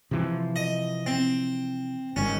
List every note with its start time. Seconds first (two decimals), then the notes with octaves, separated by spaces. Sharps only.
0.11 C3 E3 F3
0.56 D#5
1.06 C4
2.16 G1 G#2 D#3 C#4